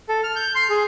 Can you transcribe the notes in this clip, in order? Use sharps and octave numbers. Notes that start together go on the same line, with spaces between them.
A4
F6
G6
C6
G#4